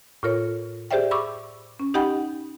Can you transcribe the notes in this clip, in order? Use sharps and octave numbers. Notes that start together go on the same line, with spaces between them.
A2 F4 A#4 C#5
G4 G#4 C5 D5 E5 G5
B5 C#6 D6 E6
C#4
D#4 G4 D#5 F#5 G5 B5